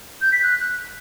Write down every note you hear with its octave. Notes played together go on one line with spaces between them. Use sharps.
G6
B6
F#6